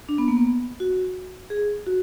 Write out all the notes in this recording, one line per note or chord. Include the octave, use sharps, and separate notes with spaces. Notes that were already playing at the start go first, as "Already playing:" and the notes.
D4
B3
A#3
B3
F#4
G#4
F#4